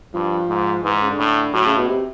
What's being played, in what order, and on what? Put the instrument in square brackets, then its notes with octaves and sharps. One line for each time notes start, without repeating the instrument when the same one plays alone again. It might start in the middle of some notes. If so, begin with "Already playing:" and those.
[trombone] G2 [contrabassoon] F3
[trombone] G#2
[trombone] G#2 [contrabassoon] E3
[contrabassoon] C#3
D3
[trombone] A2
[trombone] A2 [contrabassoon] F#3
[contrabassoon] C#3
B2
C3